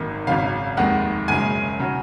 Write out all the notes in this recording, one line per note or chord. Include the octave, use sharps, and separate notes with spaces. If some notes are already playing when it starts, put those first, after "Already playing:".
Already playing: G#1 F#2 D#3 A#3
G#1 F#2 C#3 F5
F1 D#2 D#3 G#3 F#5
F#1 F#2 C#3 G#3 G#5
C#3 F#3